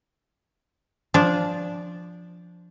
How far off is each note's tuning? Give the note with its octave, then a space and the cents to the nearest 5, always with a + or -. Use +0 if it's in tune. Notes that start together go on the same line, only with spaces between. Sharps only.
F3 +0 D4 -10